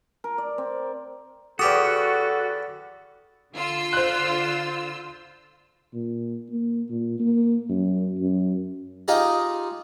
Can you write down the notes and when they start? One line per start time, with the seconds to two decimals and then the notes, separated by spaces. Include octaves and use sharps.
0.24 A#4
0.38 D5
0.58 C4
1.59 E2 F#4 G4 A4 D#6
3.55 D3 F4 E6
3.93 C5 F#6
5.94 A#2
6.51 A#3
6.90 A#2
7.19 A#3
7.69 F#2
8.19 F#2
9.08 D#4 F4 G4 G#4 D#5